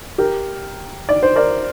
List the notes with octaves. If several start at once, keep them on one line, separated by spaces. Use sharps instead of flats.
G4 A#4
D5
C5
A#4 D5